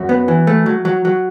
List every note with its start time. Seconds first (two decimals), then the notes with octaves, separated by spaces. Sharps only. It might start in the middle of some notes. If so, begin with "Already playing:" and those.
Already playing: F#2 F#4
0.09 B3
0.28 E3
0.47 A3
0.66 F#3
0.85 F#3
1.05 F#3